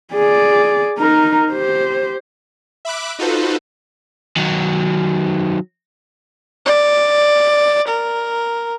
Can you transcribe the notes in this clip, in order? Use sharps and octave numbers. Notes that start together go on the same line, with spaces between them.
G#4 D5
D#4 A#4
G4 C5
E5 B5 D6 F#6
D#4 F4 F#4 A4 B4 C5
D#3 F#3
D5
A#4